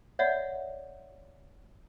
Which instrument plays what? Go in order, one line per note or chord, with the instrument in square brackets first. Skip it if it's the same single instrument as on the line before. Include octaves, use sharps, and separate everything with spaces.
[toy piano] C#5 D5 E5 F#5